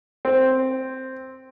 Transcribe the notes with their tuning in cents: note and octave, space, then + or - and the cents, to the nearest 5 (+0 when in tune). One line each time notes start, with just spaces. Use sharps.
C4 +0